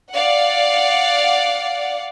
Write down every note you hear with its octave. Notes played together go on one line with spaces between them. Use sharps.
D5 F5 F#5